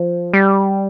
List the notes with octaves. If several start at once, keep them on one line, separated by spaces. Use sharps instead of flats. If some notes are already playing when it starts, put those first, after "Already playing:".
Already playing: F3
G3